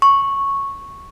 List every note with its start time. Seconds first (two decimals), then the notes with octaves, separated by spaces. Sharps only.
0.02 C#6